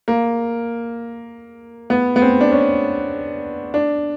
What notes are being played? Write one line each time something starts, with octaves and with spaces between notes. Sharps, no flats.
A#3
B3
B3
C4
D4
C#4
D4